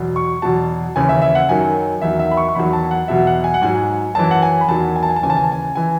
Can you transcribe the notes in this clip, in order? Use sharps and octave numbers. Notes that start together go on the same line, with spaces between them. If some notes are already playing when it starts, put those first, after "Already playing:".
Already playing: E2 B2 F#3
C#6
E2 B2 F#3 A5
D#2 C#3 E3 G#5
E5
E5
F#5
F#2 D#3 F#3 G#5
E2 D#3 F#3 E5
E5
B5
C#6
C#6
E2 D#3 F#3 B5
A5
F#5
E2 B2 F#3 E5
F#5
G#5
F#5
G#2 F#3 G#5
F#2 E3 A5
F#5
G#5
B5
E2 D#3 F#3 A5
G#5
A5
G#5
A5
D#2 C#3 E3 G#5
A5
G#5
A5
G#5
E3 G#5